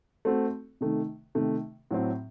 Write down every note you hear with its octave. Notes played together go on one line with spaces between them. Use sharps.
A3 C4 F#4 A4
C3 D#3 A3
C3 D#3 A3
A2 F#3 C4